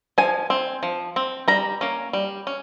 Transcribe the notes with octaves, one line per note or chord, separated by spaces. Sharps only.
F3 G#5
C4
F3
C4
G3 A#5
A#3 C#4
G3
C#4